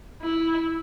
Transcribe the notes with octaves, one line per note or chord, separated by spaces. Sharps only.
E4